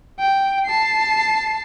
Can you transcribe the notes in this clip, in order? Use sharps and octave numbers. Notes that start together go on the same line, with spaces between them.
G5
A5 C7